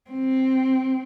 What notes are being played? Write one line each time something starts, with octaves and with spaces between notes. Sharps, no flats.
C4